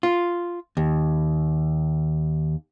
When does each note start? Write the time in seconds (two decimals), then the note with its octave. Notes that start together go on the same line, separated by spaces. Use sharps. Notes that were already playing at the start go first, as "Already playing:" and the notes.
0.03 F4
0.77 D#2